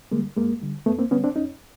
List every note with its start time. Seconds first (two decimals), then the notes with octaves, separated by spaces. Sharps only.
0.11 D3 G3 G#3 A#3
0.36 F#2 G#3 A#3
0.61 D3 G3
0.86 F2 A3 B3
0.99 A#3 C4
1.11 D3 G3 B3 C#4
1.24 C4 D4
1.36 F2 C#4 D#4